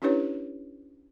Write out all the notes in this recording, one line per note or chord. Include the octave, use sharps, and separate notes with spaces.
C#4 D4 E4 G4 B4 C#5